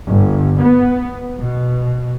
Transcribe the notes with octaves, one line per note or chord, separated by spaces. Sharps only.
G1
B3
B2